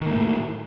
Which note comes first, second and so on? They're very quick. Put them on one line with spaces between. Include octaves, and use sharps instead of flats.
D#3 A#3 A3 A2